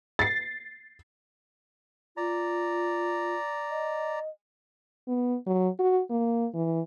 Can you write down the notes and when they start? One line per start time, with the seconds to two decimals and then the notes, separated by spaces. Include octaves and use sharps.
0.19 A6 C7
2.17 F4 D5 A#5
3.71 D#5
5.08 B3
5.47 F#3
5.79 F#4
6.10 A#3
6.54 E3